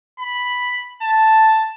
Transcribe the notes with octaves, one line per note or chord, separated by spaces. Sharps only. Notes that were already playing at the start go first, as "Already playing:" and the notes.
B5
A5